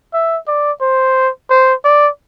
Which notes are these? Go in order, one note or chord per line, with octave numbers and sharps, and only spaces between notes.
E5
D5
C5
C5
D5